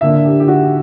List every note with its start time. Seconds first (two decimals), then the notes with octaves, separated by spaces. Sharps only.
0.01 D3 A#3 D4 E5
0.25 G4
0.40 G4
0.48 F#4